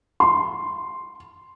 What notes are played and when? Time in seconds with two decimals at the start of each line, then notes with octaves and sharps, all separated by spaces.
0.20 C6